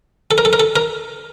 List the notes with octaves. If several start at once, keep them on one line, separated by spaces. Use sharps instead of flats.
A4
A#4
A4
A#4
A4
A#4